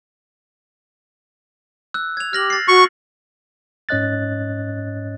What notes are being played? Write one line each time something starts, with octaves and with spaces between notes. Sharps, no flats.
E6 F#6
G#6 F7
G4 F6 A#6 F#7
A6 C7
F#4 C#6
G#2 C#4 C#5 D#5 F#6 A6